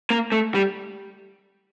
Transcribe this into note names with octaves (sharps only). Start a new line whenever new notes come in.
A#3
A3
G3